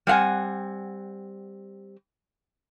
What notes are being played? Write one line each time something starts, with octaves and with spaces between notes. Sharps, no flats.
G3 C4 F5 F#5 G#5